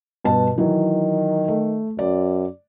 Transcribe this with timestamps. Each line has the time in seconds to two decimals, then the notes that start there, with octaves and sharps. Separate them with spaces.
0.24 G2 B2 A5
0.58 D#3 E3 F#3
1.48 A3
1.99 F#2 D5